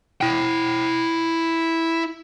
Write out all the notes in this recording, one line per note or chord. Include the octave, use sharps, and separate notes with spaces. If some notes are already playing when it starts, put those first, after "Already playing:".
E4 G5